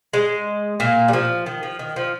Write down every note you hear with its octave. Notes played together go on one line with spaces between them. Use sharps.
G#3
A#2 A#3
G3
F3
D#3
F3
D#3
F3